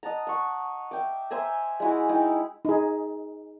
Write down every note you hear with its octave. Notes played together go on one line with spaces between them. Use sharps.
D#5 F#5 A5 A#5
F#5 C#6
E5 G5 D6
C5 E5 G#5 A#5
G#3 E4 F#4
G#3 D#4 E4 G5
D#4 G#4